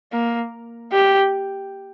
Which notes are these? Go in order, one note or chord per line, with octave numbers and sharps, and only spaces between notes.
A#3
G4